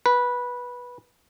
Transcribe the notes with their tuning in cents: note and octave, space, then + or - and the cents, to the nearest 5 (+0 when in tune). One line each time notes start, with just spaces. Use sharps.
B4 -10